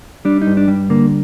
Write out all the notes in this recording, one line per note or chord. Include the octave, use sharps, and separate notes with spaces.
G3 D4
D#4
G2
D4
G3
D3 A#3